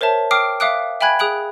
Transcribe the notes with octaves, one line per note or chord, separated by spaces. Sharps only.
A#4 C5 C#5 E5 A5
G5 D6 D#6 F6 C7 D7
E5 F5 D6 D#6 F#6 D7
E5 G5 G#5 B5 F#6 G#6
G#4 D#6 F#6 D7 F#7